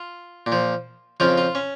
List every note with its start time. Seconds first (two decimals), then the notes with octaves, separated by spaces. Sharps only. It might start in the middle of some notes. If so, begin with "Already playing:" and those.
Already playing: F4
0.46 A#2
0.52 F3
1.20 F2 C#3 F3 F4
1.38 F4
1.55 C#4